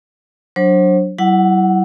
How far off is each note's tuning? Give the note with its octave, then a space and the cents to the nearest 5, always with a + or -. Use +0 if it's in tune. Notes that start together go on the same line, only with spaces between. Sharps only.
F#3 +0 D4 +0 C5 +35
F#3 +45 E4 +0 F#5 +5